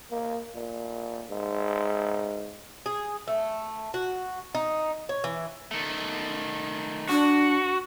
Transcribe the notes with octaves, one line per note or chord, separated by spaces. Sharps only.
A#3
A#2
G#2
G#4
A3
F#4
D#4
C#5
E3
D#3 A3
D4 F#4